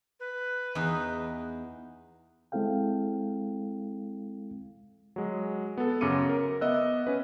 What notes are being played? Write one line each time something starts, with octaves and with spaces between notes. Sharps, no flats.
B4
E2 D#4
G#3 C4 E4 A4 F5 G5
F#3 G#3
B3 A4
F#2 C#3 D6 C#7 D#7
A#4
B3 B4 D#5 E5 E6 F#6
C#4 B4